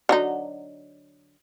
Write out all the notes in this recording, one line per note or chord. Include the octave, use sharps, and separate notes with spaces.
D3 F#3 D#4